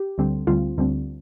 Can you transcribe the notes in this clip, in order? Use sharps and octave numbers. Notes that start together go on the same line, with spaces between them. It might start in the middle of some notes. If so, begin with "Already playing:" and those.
Already playing: G4
D2 D3 G3 C4
D2 D3 G3 C4 F4
D2 D3 G3 C4